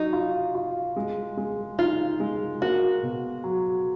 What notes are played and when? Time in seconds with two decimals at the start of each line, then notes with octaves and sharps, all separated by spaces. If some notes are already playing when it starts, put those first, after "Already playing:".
Already playing: F#3 D#4
0.13 F4
0.55 F4
0.96 G#3
1.37 G#3
1.79 D#4 F4
2.20 G#3
2.61 A#3 F#4
3.03 B2
3.44 F#3